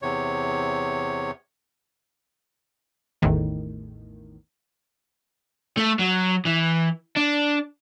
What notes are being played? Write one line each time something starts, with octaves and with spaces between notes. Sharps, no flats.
E2 C3 C#5
A1 E2 A2 D#3
A3
F#3
E3
D4